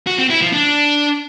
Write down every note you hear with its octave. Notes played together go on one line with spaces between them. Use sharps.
F#4
C4
E4
F3
D4